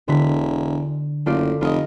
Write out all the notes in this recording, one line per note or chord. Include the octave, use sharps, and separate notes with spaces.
E1 D3 B6
F#1 A3 F4 D5
F1 F4 D#5